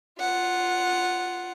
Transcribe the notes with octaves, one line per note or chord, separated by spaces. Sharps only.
F4 F#5